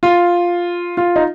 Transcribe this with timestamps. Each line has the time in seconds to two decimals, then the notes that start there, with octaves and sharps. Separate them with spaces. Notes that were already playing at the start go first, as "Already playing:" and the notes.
0.03 F4
0.97 F4
1.16 D#4